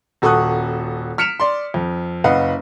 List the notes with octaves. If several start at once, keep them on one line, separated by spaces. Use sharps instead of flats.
D#1 F#4 A4 C#6 D#6 F#6
F6 B6 C#7 D7 E7 F7
D5 C6
F2
F#1 B4 D#5 F5 F#5